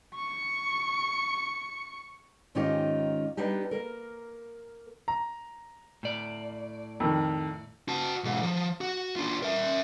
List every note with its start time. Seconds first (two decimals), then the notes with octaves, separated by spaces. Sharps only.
0.15 C#6 C#7
2.55 G#2 D#3 C#4 D#4 F4 G4
3.37 G3 B3 D4 D#4 G4
3.71 A#3 A#4
5.08 A#5
6.03 A2 D5
7.00 F2 D#3
7.89 F#4 A5
8.24 B1 G#2
8.43 F3
8.81 F#4
9.16 D4 F4
9.43 A#4 E5